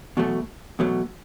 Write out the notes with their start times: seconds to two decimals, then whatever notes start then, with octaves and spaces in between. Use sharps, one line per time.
0.17 E2 B2 F#3 A3
0.79 E2 B2 F#3 A3